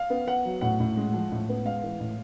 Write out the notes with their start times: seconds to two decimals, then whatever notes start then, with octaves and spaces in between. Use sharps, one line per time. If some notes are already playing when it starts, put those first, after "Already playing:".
Already playing: F5
0.10 B3
0.27 B3 F#5
0.45 F#3
0.61 A2 F#5
0.80 A2
0.97 G#3
1.14 F3
1.32 A2
1.49 B3
1.65 G#3 F5
1.84 E3
2.00 A2